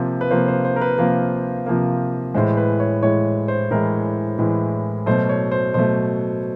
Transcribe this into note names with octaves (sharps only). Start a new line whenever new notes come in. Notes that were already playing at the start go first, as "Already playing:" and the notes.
Already playing: C3 F3 A#3
B4
C3 F3 A#3 C5
C5
C5
A#4
B4
C3 F3 A#3 A#4
C3 F3 A#3
A2 E3 G#3 C5
B4
C#5
A2 E3 G#3 C#5
C5
A2 E3 G#3 A#4
A2 E3 G#3
B2 F#3 A3 C5
C#5
C5
B2 F#3 A3 C5